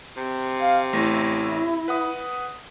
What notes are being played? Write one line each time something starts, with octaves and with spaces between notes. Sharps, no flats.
C3
F5
A1 A3 E4 A#6
B4 F#5 D#6